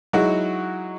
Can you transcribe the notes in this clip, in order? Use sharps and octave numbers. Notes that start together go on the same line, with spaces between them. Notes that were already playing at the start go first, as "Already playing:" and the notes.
F#3 G#3 D#4 E4 F#4